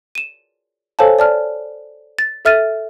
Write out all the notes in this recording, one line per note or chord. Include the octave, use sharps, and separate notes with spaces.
D#7 E7
A4 C5 C#5 F5 G#5 A5
D5 A5 F6
A6
A4 E5 F6 A6 D#7